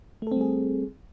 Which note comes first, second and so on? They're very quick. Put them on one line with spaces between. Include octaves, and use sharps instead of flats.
A3 A4 C4 G3 G#4